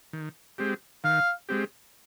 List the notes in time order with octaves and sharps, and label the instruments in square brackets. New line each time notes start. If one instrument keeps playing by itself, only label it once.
[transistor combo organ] D#3
G#3 C4 G4
[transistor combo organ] D#3 [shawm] F5
[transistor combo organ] G#3 C4 G4